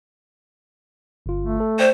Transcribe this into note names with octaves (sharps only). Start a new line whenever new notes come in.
G1 F4
A3
A4
C5 D5 G5